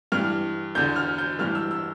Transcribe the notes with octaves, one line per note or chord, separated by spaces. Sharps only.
G2 E3 F6
E2 D3 G6
F6
G6
G2 E3 F6
E6
E6